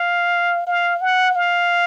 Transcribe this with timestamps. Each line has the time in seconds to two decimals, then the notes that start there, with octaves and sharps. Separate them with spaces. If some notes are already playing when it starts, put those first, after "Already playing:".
Already playing: F5
0.67 F5
1.01 F#5
1.36 F5